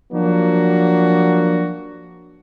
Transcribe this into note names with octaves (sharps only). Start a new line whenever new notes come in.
F3 F#3 A#3 D4 F#4